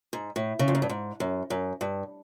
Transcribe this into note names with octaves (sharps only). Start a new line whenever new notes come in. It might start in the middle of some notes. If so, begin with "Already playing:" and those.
G#2
A2
C#3
F2
F#2
G2
G#2
F#2
F#2
G2